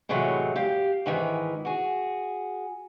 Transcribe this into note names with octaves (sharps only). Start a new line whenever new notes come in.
A2 C3 E3 F#3 G#3 A3
G4 F5
G#2 D#3 E3
F#4 G#4